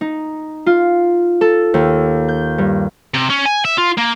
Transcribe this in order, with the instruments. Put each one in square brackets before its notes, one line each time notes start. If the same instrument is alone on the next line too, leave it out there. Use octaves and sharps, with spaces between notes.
[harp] D#4
F4
A4
D#2
G6
G2
[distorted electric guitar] C3
C#4
G#5
E5
F4
A#3